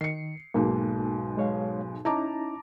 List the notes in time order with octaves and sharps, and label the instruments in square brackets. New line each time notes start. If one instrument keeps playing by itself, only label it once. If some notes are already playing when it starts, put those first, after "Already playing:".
[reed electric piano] D#3 [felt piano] C7 C#7
[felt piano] B1 G#2 B2 [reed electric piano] A#3
[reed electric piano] G#3 C#5 F5
[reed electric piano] C#4 D#4 E4 [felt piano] A5 A#5 D6